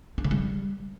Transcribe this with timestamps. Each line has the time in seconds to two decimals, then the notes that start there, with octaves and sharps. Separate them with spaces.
0.18 D4
0.24 C#3
0.31 G3